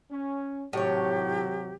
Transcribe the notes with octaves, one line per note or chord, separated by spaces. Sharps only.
C#4
G#1 A2 C3 F#3 G4 C#5